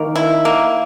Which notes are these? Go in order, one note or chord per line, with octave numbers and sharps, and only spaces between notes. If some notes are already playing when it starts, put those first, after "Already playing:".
Already playing: D#3 A#3
E4
A#3